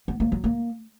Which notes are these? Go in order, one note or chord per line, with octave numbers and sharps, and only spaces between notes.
B3
A#3
F#3
A#3